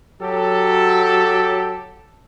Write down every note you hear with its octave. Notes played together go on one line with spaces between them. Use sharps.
F#3 G4 A4